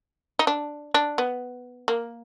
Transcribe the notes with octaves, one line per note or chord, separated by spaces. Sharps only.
D#4
D4
D4
B3
A#3